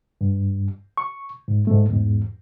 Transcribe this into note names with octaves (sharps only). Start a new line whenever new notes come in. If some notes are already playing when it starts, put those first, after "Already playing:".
G2
C#6
G#2
G#2 A3
E2 G#2